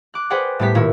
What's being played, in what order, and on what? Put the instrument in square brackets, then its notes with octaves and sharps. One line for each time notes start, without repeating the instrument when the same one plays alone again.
[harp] D6 F#6
G#4 B4 C5 D5 F#5 G5
A2 G3 B3 G4 B6
D#1 A#2 E4 C#5